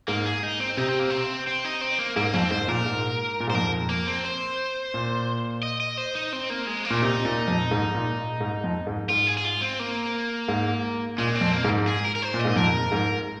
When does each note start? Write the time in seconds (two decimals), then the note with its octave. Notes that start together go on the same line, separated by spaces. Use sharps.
0.08 G#2 A#3
0.25 G#4
0.43 D#4
0.60 C4
0.77 C3 D#4
0.88 C4
0.99 A#3
1.10 C4
1.47 C4
1.64 D#4
1.81 C4
1.99 A#3
2.16 G#2 A#3
2.33 F2 C4
2.51 G#2 C5
2.68 A#2 A#4
2.86 G#2
3.40 A#2
3.48 G#2
3.50 C5
3.55 F2 A#4
3.90 A#3
4.07 C4
4.25 C5
4.94 A#2
5.63 D#5
5.80 D#5
5.98 C5
6.15 D#4
6.33 C4
6.50 A#3
6.67 G#3
6.85 A#3
6.90 A#2
7.02 C3 D#4
7.25 A#2
7.48 F2
7.71 G#2
7.95 A#2
8.41 G#2
8.64 F2
8.87 G#2
9.10 G#2 F4
9.27 G#4
9.37 G#4
9.45 F4
9.62 C4
9.79 A#3
10.48 G#2
11.18 A#2 G#3
11.35 C4
11.41 F2
11.53 A#3
11.64 G#2
11.87 G#4
12.04 A#4
12.15 A#4
12.22 C5
12.34 A#2
12.39 D#5
12.45 G#2
12.56 F2 A#4
12.92 G#2